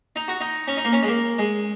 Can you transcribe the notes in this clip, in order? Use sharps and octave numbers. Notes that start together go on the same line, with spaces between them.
D#4
F#4
D#4
C#4
D#4
A#3
C#4
G#3
A#3
G#3